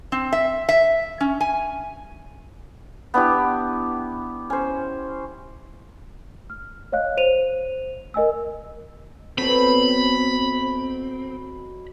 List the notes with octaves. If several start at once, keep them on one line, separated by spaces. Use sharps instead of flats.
C4
E5
E5
C#4
G#5
B3 D4 E4 G4
C#4 C5
F6
C#5 D#5 F5 F#6
C5 D#7 F7
A#4 D#5 G#5 E6
B2 F#3 C4 A4 B5